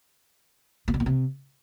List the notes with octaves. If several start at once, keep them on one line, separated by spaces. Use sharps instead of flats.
A#2
C3
A#2
C3